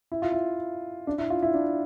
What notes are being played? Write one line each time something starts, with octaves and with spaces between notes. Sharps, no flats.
E4
F4
E4
D4
E4
F4
E4
D4